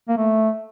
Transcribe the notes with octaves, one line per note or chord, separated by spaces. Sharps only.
A#3
A3